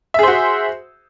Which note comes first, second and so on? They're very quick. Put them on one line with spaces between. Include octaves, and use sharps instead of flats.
E5 G#4 C5 F#4